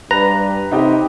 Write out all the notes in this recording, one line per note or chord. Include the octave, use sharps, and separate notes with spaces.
G2 B4 A#5
C3 D#4 G4 D#5